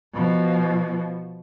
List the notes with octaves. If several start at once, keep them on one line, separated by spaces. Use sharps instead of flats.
B2 F3